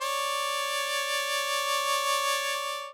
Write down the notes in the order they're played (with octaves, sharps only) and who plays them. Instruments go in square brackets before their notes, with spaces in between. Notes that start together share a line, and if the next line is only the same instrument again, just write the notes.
[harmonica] C#5 D5